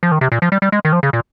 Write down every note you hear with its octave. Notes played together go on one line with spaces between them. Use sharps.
F3
D#3
C3
A#2
F3
G3
G3
G#3
D#3
F3
C#3
A#2